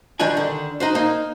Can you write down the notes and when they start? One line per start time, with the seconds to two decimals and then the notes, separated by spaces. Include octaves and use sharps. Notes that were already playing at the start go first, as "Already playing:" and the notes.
0.20 D#3 G3 D4 B4 D5 G#5
0.37 D3 D#3
0.80 D#4 F#4 C5
0.95 A#3 D#4